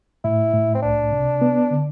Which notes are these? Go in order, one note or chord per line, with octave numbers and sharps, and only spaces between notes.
A2 E4
A2
C4
C2 D4
C3
B3
D3